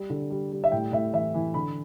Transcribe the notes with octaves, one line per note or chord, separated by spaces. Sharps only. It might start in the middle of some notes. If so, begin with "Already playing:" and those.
Already playing: G3
D3
G3
G3
E5
A2 G5
A2 E5
E3 E5
E3
D3 B5